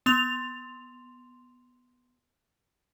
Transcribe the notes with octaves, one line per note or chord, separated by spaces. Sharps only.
B3 C6 F7